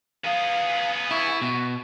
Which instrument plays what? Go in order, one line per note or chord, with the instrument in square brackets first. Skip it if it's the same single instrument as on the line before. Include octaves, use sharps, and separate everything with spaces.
[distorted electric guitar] B3 G#4 [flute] F5
[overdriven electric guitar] E4 [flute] C#6
[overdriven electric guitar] B2